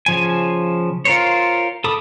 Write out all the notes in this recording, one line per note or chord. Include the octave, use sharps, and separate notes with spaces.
C#3 F3 G#5
F4 A#4 C5 C#5
A4 B5 D6 D#6